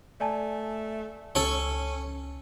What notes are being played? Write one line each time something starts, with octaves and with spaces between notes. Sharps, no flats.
A3 D5 G#5 A5
C#2 C#4 A4 C#5